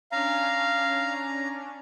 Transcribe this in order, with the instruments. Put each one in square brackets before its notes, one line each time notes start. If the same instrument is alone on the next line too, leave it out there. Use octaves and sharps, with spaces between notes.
[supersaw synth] C#4 D4 [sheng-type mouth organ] F5 [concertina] A#5